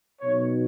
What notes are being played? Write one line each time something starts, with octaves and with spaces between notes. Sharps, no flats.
B2 F#3 B3 D#4 C#5